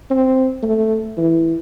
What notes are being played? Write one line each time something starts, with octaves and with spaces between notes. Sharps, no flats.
C4
A3
E3